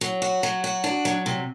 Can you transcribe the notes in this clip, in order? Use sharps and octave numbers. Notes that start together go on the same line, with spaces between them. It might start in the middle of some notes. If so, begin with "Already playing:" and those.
F#3
F#4
F#3
F#4
D4
F#3
C3